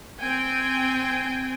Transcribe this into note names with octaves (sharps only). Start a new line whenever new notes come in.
C4 G5 G#5